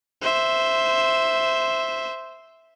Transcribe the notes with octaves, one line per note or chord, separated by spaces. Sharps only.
C5 E5